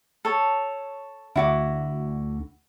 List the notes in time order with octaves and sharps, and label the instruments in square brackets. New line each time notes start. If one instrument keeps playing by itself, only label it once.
[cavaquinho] A4 C#5
[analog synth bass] D2 [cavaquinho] E4 F#4 D6